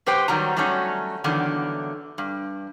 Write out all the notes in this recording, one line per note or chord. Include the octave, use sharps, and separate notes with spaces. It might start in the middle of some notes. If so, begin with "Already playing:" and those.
F#2 G4 B4 C5 G5
D#3 F#3 G3 A#5
F#3 G3 A3 C#4 D#4
E2 G2 D3 D#3 F#3
G2